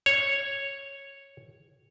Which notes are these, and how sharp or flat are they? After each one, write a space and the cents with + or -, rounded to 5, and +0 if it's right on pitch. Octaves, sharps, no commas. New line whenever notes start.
C#5 -5